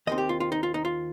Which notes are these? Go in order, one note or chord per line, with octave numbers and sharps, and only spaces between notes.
D#2 D#3 C4 D#5
G4
F4
F4
D#4
F4
D#4
F4